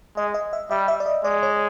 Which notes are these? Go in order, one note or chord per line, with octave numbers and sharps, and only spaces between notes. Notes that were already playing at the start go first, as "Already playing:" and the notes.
G#3 D#5
D#5
E5
G3 E5
E5
D5
D#5
G#3 D5
C#5